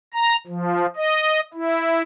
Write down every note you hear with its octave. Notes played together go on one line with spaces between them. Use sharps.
A#5
F3
D#5
E4